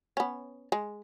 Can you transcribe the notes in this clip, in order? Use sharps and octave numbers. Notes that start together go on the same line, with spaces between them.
B3 C#4
G#3